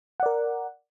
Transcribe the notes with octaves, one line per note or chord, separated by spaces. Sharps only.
A#4 D5 F#5